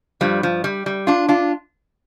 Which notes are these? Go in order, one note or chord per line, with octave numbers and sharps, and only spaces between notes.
G2 F3 G3
F3
G3
G3
D4 F4
D4 F4